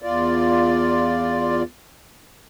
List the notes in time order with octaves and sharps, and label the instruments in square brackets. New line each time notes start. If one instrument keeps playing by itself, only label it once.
[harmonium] E2 F4 D5